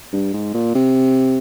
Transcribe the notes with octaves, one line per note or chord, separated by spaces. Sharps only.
G2
G#2
A#2
C3